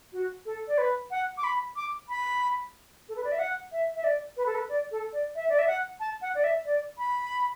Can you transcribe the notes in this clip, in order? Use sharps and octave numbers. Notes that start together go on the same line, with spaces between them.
F#4
A4
D5
B4
F#5
D6
B5
D6
B5
A4
B4
D5
E5
F#5
E5
E5
D5
B4
A4
B4
D5
A4
D5
E5
D5
E5
F#5
A5
F#5
D5
E5
D5
B5